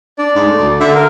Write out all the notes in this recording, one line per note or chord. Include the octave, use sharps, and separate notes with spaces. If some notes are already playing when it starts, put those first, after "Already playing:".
D4 D5
G#2
A3
D2
D3 E5
A#4